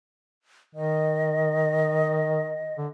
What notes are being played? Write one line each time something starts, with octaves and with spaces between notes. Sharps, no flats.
D#3 D#5
D3